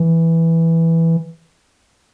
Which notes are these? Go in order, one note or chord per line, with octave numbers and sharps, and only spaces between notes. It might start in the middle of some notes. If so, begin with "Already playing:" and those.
Already playing: E3